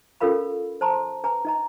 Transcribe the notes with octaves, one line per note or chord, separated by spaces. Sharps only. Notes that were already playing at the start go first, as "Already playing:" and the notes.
C#4 F4 A4 A#4 F5 B5
C5 A5 A#5 C6
B4 G#5 A#5
D#4 D#5 A#5